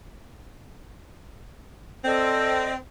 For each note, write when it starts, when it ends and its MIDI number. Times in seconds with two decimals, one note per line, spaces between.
2.05 2.76 60
2.05 2.69 69
2.05 2.73 74
2.05 2.73 75